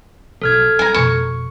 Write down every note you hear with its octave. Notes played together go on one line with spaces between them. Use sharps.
B1 A4 F6 G#6
G3 G#5 A#5
F2 B2 C#6